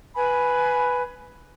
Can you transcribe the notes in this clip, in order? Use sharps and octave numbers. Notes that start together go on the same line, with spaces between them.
B4 G#5 B5